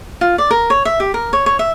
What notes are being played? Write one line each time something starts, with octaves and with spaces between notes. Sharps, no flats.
F4
D5
A#4
C#5
E5
G4
A#4
C#5
C#5
E5